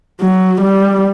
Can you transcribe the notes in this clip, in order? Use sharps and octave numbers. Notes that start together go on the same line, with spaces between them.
F#3
G3